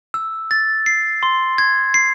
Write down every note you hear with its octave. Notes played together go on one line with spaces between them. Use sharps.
E6
A6
C7
C6
G#6
C7